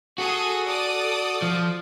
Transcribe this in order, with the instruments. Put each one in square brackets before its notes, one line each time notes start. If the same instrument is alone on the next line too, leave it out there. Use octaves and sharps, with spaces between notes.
[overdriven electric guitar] F#4 [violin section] G#4 A4 D#6
[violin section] A4 D5 D#6
[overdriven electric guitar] F3